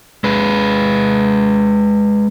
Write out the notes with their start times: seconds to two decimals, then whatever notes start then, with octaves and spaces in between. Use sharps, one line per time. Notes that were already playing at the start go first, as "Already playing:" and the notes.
0.24 G#3 B4